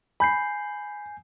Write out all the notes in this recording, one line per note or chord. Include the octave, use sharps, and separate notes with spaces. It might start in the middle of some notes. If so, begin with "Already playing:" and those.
G#5 B5 G6 C7